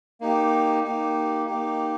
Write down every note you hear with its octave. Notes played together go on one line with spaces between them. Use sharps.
A#3 D#4 G4
A#3 D#4 G4
A#3 D#4 G4